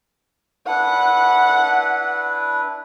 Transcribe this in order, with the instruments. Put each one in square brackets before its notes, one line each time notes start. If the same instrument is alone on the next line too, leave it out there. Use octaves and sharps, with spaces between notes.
[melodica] D4 E4 B4 [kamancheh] F#5